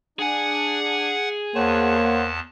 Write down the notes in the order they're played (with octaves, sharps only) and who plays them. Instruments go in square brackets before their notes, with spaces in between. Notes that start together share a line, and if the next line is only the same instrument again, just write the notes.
[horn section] D4 [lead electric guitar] G#4 G#5 [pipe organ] F#5
[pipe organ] E2 A5 [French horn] A#3 [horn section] C5 C#5 F#5